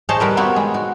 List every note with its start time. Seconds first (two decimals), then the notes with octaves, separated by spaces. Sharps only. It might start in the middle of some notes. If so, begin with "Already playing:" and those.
0.09 G#4 C5 C#5 D#5 A5
0.20 G3 A#4 B4
0.37 B3 C4 F#4 C#5
0.56 G#3
0.74 F#4